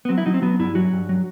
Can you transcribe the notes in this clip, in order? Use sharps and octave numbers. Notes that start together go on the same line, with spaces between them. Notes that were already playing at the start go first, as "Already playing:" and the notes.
B3
F#3 C4
E4
F#3 D#4
C4
F#3 B3
G2 E4
F#3 F#4
G2
F#3